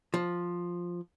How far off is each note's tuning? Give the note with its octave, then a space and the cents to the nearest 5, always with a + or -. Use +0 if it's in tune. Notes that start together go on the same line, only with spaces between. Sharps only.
F3 +5